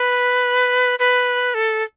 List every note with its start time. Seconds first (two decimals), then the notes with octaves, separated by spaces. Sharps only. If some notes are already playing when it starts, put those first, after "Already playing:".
Already playing: B4
0.99 B4
1.54 A4